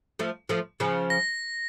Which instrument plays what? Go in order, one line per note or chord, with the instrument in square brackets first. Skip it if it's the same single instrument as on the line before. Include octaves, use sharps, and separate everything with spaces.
[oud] F3 A3
F3 A3
C#3 F3
[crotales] A#6